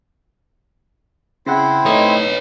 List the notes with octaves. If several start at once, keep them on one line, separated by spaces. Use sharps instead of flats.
C#3 C4 E4 C5 F#5
A3 D#4 B4 C#5 D#5